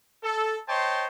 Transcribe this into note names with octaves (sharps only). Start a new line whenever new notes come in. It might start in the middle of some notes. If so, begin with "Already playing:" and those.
A4
C5 C#5 D#5 G5 A5 C6